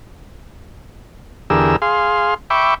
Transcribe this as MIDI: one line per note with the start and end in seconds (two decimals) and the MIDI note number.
1.50 1.76 40
1.50 1.76 50
1.50 1.76 67
1.50 1.76 68
1.50 1.76 70
1.50 1.76 88
1.82 2.34 68
1.82 2.34 77
1.82 2.34 84
2.50 2.74 76
2.50 2.74 79
2.50 2.74 83
2.50 2.74 85
2.50 2.74 86